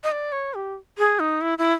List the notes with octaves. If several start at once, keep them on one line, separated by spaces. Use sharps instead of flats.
D#5
D5
C#5
G4
G#4
D#4
E4
E4